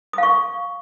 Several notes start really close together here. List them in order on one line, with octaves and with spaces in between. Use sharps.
D#6 F5 C#6